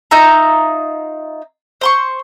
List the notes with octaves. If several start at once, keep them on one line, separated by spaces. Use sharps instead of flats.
D#4 F4 E5 A#5
C5 C6 C#6